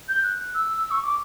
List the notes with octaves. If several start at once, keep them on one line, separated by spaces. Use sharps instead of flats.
G6
F#6
E6
C#6
D6